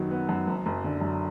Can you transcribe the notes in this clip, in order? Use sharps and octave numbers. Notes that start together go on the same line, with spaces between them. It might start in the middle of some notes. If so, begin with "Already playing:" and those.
Already playing: F#2 D#3 F#3 B3
B3
F#2
F#1
F#1
D3
F#2